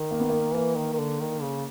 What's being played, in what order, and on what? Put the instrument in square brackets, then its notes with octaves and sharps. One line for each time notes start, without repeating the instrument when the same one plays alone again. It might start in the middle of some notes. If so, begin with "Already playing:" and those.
Already playing: [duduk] D#3
[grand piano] A#3
B3
A#3
[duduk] E3 [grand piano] A#3
[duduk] D#3
D#3
D3
D#3
C#3